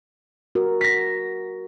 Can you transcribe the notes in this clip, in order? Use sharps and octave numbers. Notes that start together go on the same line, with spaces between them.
F#4 A#4
A#6 B6